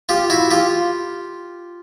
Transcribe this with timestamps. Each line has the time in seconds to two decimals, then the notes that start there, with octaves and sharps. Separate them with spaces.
0.09 F4 G4
0.30 E4 F#4
0.51 F4 G4